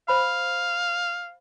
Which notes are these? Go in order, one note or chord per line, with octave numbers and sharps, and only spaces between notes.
C5 F5 B5